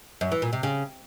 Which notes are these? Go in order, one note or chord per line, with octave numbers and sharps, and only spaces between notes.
F#2
E3
A#2
C3
C#3